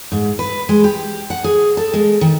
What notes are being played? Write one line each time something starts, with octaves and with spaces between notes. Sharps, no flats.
G#2
B4
G#3
G4
F#5
G#4
A4
G#3
D#3